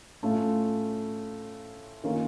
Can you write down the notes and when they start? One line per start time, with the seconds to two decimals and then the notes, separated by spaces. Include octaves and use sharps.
0.23 A2 A3 C#4 F4
2.04 D#3 A#3 C#4 F4